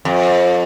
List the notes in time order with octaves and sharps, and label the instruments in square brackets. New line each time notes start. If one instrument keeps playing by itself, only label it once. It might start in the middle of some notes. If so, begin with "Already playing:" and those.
[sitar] F2